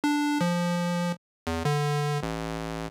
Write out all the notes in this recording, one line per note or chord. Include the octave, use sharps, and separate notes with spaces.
D4
F3
E2
D3
A1